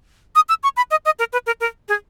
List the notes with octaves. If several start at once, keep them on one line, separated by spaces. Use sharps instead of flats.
D#6
E6
C#6
B5
D#5
D#5
A#4
B4
A#4
A#4
G#4